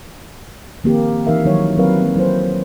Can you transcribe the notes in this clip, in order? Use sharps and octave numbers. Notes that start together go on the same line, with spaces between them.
D#3 F3 A#3 C4 G4
E3 A#3 D#4 A#4 E5 F5
D#3 F3 F#3 D#4 E4 C#5
F#3 C4 E4 A#4 B4 F5
F#3 A#3 C4
F#3 E4 B4 C5